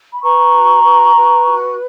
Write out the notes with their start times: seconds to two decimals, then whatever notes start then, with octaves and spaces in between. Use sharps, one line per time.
0.11 B5
0.22 B4 A#5 C#6
0.53 F#4
0.83 B4
1.16 B4
1.46 F#4